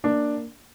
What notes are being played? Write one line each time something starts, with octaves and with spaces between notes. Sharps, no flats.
A#3 D4